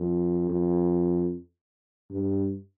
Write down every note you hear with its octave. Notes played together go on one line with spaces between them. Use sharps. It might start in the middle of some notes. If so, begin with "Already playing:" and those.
Already playing: F2
F2
G2